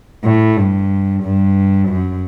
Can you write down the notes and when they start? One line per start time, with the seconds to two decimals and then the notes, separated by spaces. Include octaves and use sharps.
0.24 A2
0.57 G2
1.23 G2
1.88 F#2